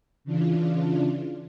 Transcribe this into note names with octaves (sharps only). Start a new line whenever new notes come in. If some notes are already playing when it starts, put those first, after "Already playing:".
C#3 E3 D4 F4